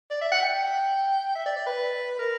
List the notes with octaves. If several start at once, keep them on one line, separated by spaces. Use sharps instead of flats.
D5
E5
F#5
G5
E5
D5
D5
B4
A#4